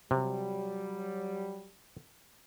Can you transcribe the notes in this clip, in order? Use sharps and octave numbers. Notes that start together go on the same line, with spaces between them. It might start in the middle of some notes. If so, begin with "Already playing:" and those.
C3 F#3 G3